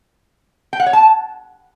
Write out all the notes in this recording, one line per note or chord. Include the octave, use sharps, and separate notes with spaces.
G5
F#5
C#5
A5